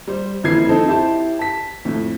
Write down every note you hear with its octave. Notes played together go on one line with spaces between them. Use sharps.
G3 C5
F#1 F2 E3 G#6 C7
F3 C4 D#4 A4 D#5
E4 G4 C5 A5
A5 B6
F2 A2